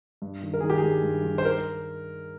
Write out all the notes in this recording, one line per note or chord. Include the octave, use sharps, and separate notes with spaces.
G2
D#3
A#4
D#3 G#4
G4
G#4
G2
G2
D#3
C5
A#4